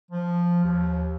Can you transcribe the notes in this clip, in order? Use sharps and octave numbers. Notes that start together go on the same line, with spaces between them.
F3
D#2